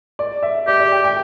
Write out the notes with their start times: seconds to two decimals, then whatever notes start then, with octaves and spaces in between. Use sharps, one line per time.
0.19 D5
0.43 E5
0.67 G4 D5
0.80 D5
0.92 G5
1.04 G5